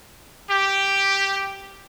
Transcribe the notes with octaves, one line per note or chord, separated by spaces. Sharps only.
G4